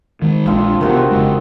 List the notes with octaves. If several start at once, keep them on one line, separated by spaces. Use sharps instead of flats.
D#3 G#3
A#1 G#3 C4 D4 F4
C3 D#3 A3 B3 F#4 G4
C4
F1 C#3 G#3